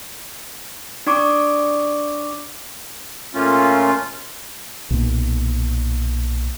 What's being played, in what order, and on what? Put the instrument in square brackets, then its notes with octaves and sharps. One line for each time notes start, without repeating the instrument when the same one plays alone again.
[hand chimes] D4 D5 C#6 D6
[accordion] A#2 A3 A#3 C#4 F4
[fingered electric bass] B1 A#2